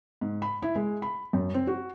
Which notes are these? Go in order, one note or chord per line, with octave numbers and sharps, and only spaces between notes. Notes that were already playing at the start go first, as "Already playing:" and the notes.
G#2
B5
E4
G#3
B5
F#2
C4
F#4